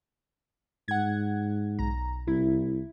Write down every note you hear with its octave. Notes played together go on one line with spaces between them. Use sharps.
G#2 F#5 G#6
B1 A#5
C2 E4